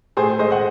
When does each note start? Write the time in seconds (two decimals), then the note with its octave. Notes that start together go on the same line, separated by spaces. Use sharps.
0.17 A2 G#4 C5
0.29 G#4
0.39 G#3 C5 D#5
0.51 D#5 F#5